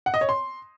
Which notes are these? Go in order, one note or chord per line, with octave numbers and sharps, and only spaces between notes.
F#5
D#5
C#5
C6